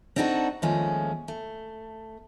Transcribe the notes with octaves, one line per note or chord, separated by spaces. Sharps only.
C4 D4 D#4 F#4 G#4 A4
D#2 F3 G#3 A3 C#4
A3